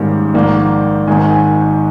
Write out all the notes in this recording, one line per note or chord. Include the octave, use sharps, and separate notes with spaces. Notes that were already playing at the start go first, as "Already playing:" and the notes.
Already playing: G#2 D#3 G3 A#3 C#4
A#1 G#2 D#3 A#3
G#1 G#2 D#3 G#5
G#5